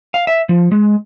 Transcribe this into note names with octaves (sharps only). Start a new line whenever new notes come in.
F5
E5
F3
G#3